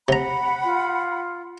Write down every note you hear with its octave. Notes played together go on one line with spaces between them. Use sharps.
C3 F#5 A#5 B5
F4